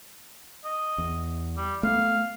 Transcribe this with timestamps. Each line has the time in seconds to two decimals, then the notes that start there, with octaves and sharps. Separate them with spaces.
0.64 D#5
0.98 E2
1.57 G3
1.83 A3 B3 F5